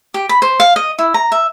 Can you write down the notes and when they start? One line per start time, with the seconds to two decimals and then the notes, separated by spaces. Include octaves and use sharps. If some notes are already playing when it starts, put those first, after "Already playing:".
0.14 G4
0.29 B5
0.42 C5
0.60 F5
0.76 D#5
0.99 E4
1.14 A#5
1.32 E5